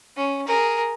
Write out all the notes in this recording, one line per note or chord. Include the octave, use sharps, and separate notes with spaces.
C#4
G#4 A#4